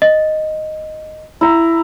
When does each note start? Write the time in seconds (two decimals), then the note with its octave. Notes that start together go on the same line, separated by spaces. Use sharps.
0.02 D#5
1.41 E4 A#5